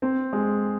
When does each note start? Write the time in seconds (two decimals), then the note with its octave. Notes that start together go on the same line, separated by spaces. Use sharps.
0.02 C4
0.33 G#3